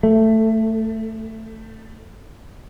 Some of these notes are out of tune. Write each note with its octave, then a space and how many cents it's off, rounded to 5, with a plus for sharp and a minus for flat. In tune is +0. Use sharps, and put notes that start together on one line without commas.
A3 +10